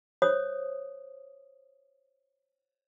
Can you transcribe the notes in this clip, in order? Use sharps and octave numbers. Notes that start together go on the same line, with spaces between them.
C5 C#5 D#6